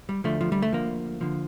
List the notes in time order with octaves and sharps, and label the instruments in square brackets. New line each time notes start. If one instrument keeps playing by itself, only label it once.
[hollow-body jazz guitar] G3
D2 D3 F3 A3
F3
G3
A3
D2 D3 F3 A#3
D3 F3